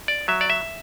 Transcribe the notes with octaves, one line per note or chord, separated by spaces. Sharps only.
D5
F#3 E5
D5
E5